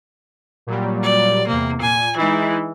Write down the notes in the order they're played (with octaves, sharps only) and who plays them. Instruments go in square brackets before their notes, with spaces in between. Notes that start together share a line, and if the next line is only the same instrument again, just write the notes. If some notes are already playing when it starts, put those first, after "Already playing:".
[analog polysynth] A#2 F#3 G3
[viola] D5
[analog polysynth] E2 C3 [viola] A#3
[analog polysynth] A#2 [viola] G#5
[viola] E3 [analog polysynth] G#3 D#4 E4